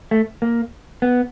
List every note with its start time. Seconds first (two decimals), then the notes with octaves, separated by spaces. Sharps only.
0.11 A3
0.42 A#3
1.02 B3